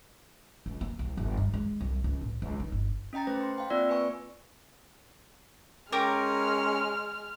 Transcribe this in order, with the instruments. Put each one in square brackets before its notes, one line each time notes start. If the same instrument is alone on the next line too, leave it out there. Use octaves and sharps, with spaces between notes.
[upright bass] C#2
A#3
C2
G1
G2
G#3
C2
C#2
A2
C#2
D#3
G1
[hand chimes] C#4 D#5 G5 A#5 A6
A3 B4 C5 A#6
C6
F5 G5 C6
A#3 C4 F4 D5 E6
B4 D5 G#5 C#6
[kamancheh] G#3 [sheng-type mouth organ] C#4 [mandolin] G4 A#4 D6 [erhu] F6